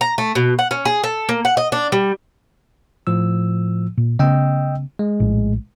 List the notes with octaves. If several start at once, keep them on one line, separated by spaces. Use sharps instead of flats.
A#5
A3
B2
F#5
C#4
G#4
A4
A#3
F#5
D#5
D4
G3
A2 F3 E6
A#2
C#3 A3 B3 D#5 G5 E6
G#3
A#1 A2